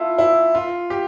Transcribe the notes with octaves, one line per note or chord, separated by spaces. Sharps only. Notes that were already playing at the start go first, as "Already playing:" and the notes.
Already playing: E4 F4 A4
E4
F4
G4